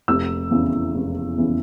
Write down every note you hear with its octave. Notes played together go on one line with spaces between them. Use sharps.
F1 E6
E2 C#3 E3
F1
E2 C#3 E3